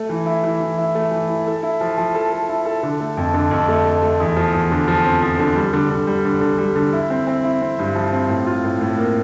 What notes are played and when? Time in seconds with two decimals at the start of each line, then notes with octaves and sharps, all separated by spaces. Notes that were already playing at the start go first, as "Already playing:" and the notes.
Already playing: A3
0.09 E3
0.26 E4
0.44 E3
0.60 E3
0.78 E4
0.95 A3
1.11 E3
1.28 E4
1.46 A4
1.63 E4
1.81 F3
1.98 F3
2.15 A4
2.32 A4
2.49 E4
2.65 A4
2.83 D3
3.00 A3
3.17 F2
3.34 D3
3.51 F2
3.68 A3
3.85 A3
4.02 A3
4.20 E2
4.36 F3
4.53 E2
4.71 D3
4.88 F3
5.05 C4
5.22 F3
5.39 D3
5.56 G3
5.73 D3
5.90 D3
6.07 G3
6.25 D3
6.41 D3
6.58 G3
6.75 D3
6.93 E4
7.10 C4
7.27 C4
7.44 E4
7.61 C4
7.79 G2
7.95 F3
8.13 C4
8.29 A2
8.46 F4
8.64 A2
8.81 A2
8.98 A#3